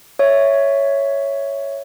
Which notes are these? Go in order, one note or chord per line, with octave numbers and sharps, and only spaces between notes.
C#5 E5